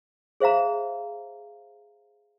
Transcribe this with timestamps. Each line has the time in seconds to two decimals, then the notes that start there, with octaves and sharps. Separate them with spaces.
0.40 G#4 C5 E5 F5 A#5